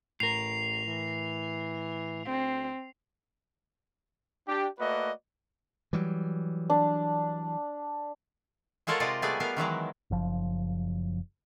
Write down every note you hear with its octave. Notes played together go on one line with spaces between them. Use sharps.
A1 A2 A#4 C7 F7
E3
D2 C4
D4 G4
A3 A#3 F#4 B4 D5 D#5
E3 F#3 G3
D4
G#3 F4 A4 A#4 C#5 F#5
C3 G#3 F4 D5 D#5
G3 A3 B3 G#4 D5
B3 A#4 F5
D#3 E3 F#3 G#3
F#1 F3